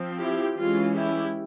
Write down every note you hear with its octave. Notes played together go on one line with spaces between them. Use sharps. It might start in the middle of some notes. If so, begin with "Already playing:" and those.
Already playing: F3 C4
E4 G4
E3 G#3 C#4 F4
E4 G4